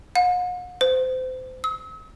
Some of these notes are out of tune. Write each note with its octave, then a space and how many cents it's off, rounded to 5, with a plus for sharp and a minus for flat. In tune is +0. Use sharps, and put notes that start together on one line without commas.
F#5 -45
C5 -30
E6 -45